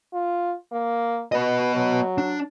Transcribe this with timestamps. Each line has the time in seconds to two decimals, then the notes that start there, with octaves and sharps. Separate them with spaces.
0.13 F4
0.72 A#3
1.32 B2 B3 D#5
1.75 F#3
2.18 D4